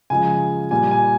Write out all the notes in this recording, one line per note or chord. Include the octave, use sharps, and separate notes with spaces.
C#3 F3 G#3 G#5
A#2 G3 G#5
G#5